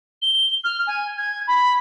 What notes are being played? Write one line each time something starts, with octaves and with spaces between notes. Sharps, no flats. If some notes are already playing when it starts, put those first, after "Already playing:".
G7
F6
G#5
G#6
B5